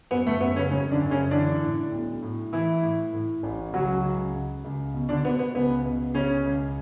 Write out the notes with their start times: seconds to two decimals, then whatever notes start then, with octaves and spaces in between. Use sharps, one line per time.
0.11 F#2 B3
0.27 A3
0.40 F#1 B3
0.56 C#3 C#4
0.71 F#2 C#3 C#4
0.91 D3 D4
1.02 F#2
1.11 C#3 C#4
1.31 D3 E3 D4
1.62 A2
1.92 B1
2.22 A2
2.53 E3 E4
2.82 A2
3.13 A2
3.43 A1
3.73 C#2 F#3 F#4
4.03 C#2
4.33 C#3
4.64 C#2
4.94 B2
5.09 D3 D4
5.24 B2 B3
5.39 B3
5.54 C#2 B3
5.85 B2
6.14 C#2 C#3 C#4
6.46 C#2